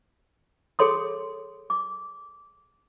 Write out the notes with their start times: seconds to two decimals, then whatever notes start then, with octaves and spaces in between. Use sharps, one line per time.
0.79 G#4 A4 C#5 C6 D#6
1.70 D6